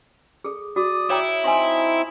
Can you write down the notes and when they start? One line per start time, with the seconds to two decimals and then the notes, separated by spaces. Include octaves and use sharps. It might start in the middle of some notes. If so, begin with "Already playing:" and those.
0.44 G#4 A4
0.76 F#4 D5 D#6
1.10 E4 C#5 G5 A#5
1.44 C4 D#4 G#5 C6